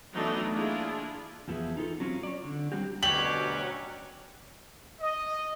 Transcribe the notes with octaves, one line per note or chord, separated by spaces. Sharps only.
E3 F#3 A3 B3 D4 D#4
A#3 D4 E4 F4 G#4
E2 F3 A3 B3 G#4 E5
D#4 F4 A4
F#3 C4 C#4 E4 F4
C#5 D5
D3
F#3 G3 C4 F#4 G4
D2 B2 F#3 G3 C#4 G4 D6 F#7
D#5